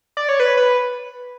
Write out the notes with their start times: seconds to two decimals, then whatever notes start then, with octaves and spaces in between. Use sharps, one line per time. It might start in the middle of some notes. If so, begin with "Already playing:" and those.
0.17 D5
0.29 C#5
0.40 B4
0.57 B4